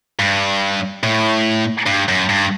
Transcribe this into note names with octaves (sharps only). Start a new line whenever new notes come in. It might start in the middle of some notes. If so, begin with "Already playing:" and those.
G2
A2
G2
F#2
G2